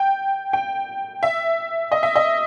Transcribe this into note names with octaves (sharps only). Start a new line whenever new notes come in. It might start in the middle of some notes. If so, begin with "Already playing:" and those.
Already playing: G5
G5
E5
D#5
E5
D#5